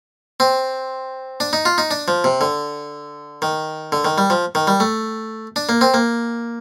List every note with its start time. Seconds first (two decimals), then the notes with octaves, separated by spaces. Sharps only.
0.40 C4
1.40 D4
1.53 D#4
1.65 F4
1.78 D#4
1.91 D4
2.08 F3
2.24 C3
2.41 D3
3.42 D#3
3.92 D3
4.05 D#3
4.18 G3
4.30 F3
4.55 D#3
4.67 G3
4.80 A3
5.56 D4
5.69 A#3
5.81 C4
5.94 A#3